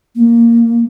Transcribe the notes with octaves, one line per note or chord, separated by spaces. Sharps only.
A#3